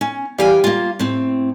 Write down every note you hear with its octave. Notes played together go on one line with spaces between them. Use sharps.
C#4
E3 G3 G4 F5 G5 G#5
A#3 F4
A2 C4